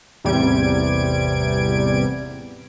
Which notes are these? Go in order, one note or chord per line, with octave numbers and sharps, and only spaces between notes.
A1 E2 C3 G3 G#6 D7